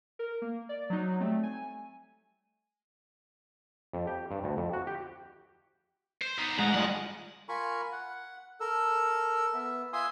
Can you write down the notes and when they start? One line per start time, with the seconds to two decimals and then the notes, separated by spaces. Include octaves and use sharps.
0.19 A#4
0.42 A#3
0.69 D5
0.90 F#3 D#4
1.20 G3 A3 C4
1.43 G#5
3.93 F2
4.07 G4
4.31 G2
4.44 D2
4.57 F2
4.73 F#4
4.87 G4
6.21 C5
6.38 B3 D#4
6.59 G#3 F#5 A#5
6.74 G3 G#3 F4 F#5
7.49 F4 A#4 G#5 B5 C#6
7.92 F#5
8.60 A4 A#4 E6
9.54 B3 E5
9.93 F4 E5 G#5 C6 D#6